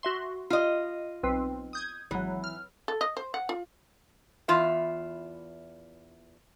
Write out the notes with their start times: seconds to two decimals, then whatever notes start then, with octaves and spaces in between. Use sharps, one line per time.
0.03 F#4 E5 C6
0.50 F4 D#5
1.23 B1 C4 B4
1.73 D#6 G6 G#6
2.11 G#1 E3 F#3
2.44 F6
2.88 A4
3.01 D#5
3.17 C5
3.34 F#5
3.49 F4
4.48 E2 F4 E5